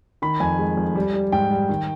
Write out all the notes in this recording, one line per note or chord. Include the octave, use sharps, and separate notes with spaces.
D#3 B5
F2 G#5
G#3
F2
G3
G3
G#2 G5
G3
D#3